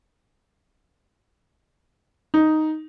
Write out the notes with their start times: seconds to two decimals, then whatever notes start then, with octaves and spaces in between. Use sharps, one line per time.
2.34 D#4